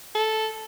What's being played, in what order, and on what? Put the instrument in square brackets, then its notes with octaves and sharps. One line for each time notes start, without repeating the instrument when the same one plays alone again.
[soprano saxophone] A4